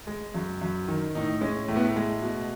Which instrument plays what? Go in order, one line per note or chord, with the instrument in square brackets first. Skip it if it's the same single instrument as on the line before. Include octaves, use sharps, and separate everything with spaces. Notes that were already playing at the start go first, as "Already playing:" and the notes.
[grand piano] G#3
F#2
F#2
D#3
A2 D#4
G#3 C#4
A2 A3
B3
A3
G#3
B2